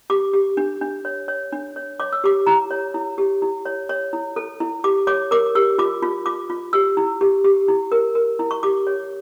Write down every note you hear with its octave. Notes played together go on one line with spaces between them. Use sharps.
G4 D6
G4
D4
D4
C#5
C#5
D4
C#5
C#5 D6
E6
G4 D6
E4 A#5
C#5
E4
G4
E4
C#5
C#5
E4
A4
E4
G4 D6
C#5 D6
A#4 D6
G4 E6
F4 D6
F4
F4 D6
F4
G4 E6
E4
G4
G4
E4
A#4
A#4
E4
C#6
G4 D6
C#5